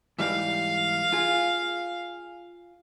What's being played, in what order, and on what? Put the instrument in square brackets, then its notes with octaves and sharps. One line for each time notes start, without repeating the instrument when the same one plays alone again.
[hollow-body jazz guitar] G#2 E3 G3 [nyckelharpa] F5
[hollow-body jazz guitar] F4 G#4